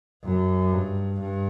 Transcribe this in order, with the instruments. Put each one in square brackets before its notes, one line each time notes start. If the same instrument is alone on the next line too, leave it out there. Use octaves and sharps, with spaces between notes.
[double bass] F#2
G2
G2